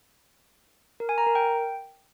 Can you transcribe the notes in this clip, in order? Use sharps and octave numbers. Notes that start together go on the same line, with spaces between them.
A#4
G#5
A#5
A#4
G5